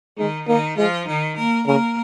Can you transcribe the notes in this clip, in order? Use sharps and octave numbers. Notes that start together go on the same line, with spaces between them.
D#3 G#3 D#4
D#3 A#3 D#4
F3 G#3 F4
D#3 D#4
A#3 A#4
C#3 A#3 A#4